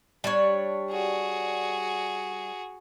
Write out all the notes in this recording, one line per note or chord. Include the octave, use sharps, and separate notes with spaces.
G3 D4 C#5
F#4 G#4